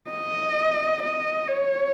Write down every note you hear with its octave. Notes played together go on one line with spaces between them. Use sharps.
D#5
D#5
C#5